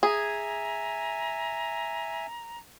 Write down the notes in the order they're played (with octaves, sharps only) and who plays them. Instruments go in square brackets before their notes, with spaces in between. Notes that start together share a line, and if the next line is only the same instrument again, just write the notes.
[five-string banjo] G#4 [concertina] E5 G#5 [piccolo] A#5